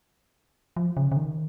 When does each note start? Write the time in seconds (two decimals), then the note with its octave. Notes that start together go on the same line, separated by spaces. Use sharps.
0.76 F3
0.97 C#3
1.12 C#3
1.17 D#3